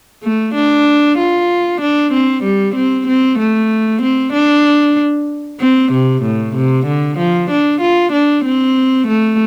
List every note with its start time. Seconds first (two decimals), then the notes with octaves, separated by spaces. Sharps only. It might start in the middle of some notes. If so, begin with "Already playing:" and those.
0.23 A3
0.54 D4
1.18 F4
1.81 D4
2.13 C4
2.43 G3
2.75 C4
3.07 C4
3.39 A3
4.02 C4
4.33 D4
5.60 C4
5.92 C3
6.23 A2
6.55 C3
6.86 D3
7.18 F3
7.51 D4
7.81 F4
8.13 D4
8.44 C4
9.08 A3